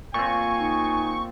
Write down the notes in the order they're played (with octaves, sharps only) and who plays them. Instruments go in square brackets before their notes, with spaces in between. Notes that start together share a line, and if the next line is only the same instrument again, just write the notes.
[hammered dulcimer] A#2 C4 [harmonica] G#5 [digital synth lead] C#6
[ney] D#4